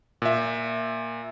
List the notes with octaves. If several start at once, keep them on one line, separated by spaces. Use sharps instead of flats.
A#2 E5